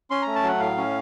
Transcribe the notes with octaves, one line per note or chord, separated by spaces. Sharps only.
C#4 C6
A3 A#5
A5
F#3 F#5
A2 F5
C#4